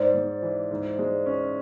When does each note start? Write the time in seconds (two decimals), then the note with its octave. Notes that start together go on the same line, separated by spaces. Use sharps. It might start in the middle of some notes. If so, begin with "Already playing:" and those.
Already playing: G#2 C5 D5
0.14 G#2
0.43 E3
0.71 G#2
0.99 G#3
1.26 C#4